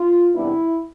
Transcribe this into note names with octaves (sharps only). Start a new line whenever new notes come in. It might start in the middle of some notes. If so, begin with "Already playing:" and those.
Already playing: F4
E2 C3 G3 B3 D4 E4